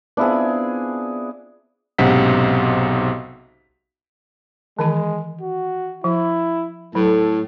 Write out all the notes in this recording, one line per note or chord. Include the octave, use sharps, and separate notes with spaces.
B3 C4 D4 E4 F4 G#4
B1 G#2 C3 C#4 F#5 B6
D#3 E3 G#3 A5
F#4
F3 E4
A2 F#3 A4